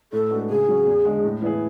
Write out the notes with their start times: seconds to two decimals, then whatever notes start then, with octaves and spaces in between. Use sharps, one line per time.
0.12 A2 A4
0.31 G#3 B3 D4 F#4
0.49 C#3 G#4
0.68 F#3 C#4
0.87 E2
1.05 D3 G#3
1.24 A2
1.42 E3 B3 E4 G#4